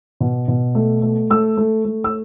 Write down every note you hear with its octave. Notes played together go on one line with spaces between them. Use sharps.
B2
B2
A3
A3
A3 E6
A3
A3
E6